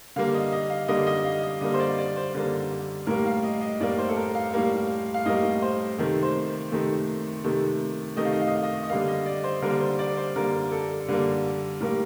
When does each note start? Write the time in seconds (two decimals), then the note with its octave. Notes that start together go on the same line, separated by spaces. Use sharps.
0.16 D3 G3 A#3 F5
0.34 D#5
0.52 D#5
0.70 F5
0.88 D3 G3 A#3 D#5
1.07 D#5
1.25 F5
1.43 D#5
1.61 D3 G3 A#3 D#5
1.74 C5
1.80 D5
1.98 D5
2.16 C5
2.35 D3 G3 A#3
3.07 A2 G3 A#3 A#4
3.25 F5
3.44 D#5
3.61 D#5
3.80 A2 G3 A#3 D5
3.98 C5
4.09 A4
4.17 A#4
4.35 F5
4.53 A2 G3 A#3
5.14 F5
5.26 A2 G3 A#3 D#5
5.62 C5
5.98 C3 D#3 A3
6.23 C5
6.72 C3 D#3 A3
7.44 C3 D#3 A3
8.16 C3 D#3 A3 D#5
8.25 F5
8.33 D#5
8.40 F5
8.48 D#5
8.56 F5
8.63 D#5
8.83 D#5
8.89 D3 G3 A#3 F5
9.08 D#5
9.26 D5
9.44 C5
9.62 D3 G3 A#3 A#4
9.81 C5
9.99 D5
10.17 C5
10.36 D3 G3 A#3 A#4
10.71 A4
11.09 D3 G3 A#3
11.80 A2 G3 A#3 A#4